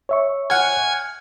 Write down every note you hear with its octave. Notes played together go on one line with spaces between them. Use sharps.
C#5 E5 C#6
F#5 G#5 F6